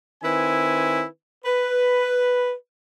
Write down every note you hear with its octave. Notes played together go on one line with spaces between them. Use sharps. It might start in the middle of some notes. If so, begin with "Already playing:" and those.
D#3 C4 E4 B4 G#5
B4